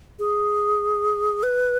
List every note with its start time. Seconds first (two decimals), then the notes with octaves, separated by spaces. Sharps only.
0.19 G#4
1.43 B4